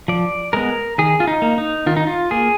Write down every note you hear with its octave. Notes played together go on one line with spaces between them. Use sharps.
F3 D5
G#3 B3 A#4
D#3 G#4
F4
D#4
A#3
D#4
D#3 F4
D#4
F4
A#3 G#4